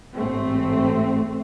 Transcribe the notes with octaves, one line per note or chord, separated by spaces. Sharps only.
A1 G#2 A3 C4